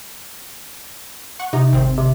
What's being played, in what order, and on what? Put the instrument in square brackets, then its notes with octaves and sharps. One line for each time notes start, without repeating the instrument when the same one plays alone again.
[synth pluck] F#5 C#6
[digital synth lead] C3 [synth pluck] D#4
[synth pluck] G#1 C4
[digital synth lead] C3